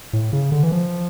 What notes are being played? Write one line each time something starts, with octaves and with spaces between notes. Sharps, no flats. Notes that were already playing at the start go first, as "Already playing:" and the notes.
A2
C#3
D3
E3
F3